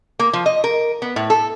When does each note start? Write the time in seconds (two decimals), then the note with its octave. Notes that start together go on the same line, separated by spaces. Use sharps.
0.19 A#3
0.33 F3
0.46 D#5
0.64 A#4
1.02 B3
1.16 A2
1.30 A4